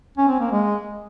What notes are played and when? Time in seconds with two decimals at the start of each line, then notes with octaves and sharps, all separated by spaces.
0.17 C#4
0.28 C4
0.40 A#3
0.52 G#3